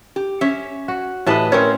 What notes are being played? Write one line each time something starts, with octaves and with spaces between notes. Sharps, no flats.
G4
C#4 C#5 E5
F#4
A2 E3 G4 B4 D#5 A5
C4 C#4 A#4 C5 C#5